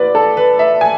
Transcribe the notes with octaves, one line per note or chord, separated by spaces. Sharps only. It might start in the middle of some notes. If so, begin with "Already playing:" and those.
Already playing: A1 B4 D5
A4
B4
E5
G#5